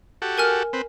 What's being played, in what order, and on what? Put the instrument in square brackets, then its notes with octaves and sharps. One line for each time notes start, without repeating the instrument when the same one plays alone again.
[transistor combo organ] F#4 G4 A4
[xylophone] A#4 G#5 F6
[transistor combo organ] C4 B4